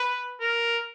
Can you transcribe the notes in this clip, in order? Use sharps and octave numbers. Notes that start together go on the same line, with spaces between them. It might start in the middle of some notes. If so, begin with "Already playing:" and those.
Already playing: B4
A#4